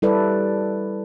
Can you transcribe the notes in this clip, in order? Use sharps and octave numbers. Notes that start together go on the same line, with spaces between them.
G3 E4 A4 B4 D5